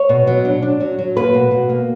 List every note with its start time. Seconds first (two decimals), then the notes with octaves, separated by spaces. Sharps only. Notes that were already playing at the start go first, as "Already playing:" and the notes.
Already playing: C#5
0.09 B2
0.27 F#3
0.45 D4
0.62 D4
0.81 F#3
0.99 F#3
1.16 A#3 B4
1.34 B2
1.51 B2
1.69 A#3